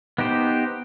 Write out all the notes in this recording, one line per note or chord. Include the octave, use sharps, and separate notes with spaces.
B3 D#4 G4 C5